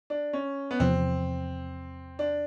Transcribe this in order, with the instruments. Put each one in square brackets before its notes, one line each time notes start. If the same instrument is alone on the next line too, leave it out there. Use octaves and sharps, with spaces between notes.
[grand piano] D4
C#4
B3
[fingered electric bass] E2 C3 F3 [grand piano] C4
[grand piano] D4